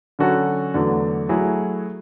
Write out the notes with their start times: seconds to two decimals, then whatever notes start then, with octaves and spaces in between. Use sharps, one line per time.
0.19 D3 F#3 C#4 F#4 A4
0.74 E2 D3 F#3 A3
1.29 F#3 A3 E4 G#4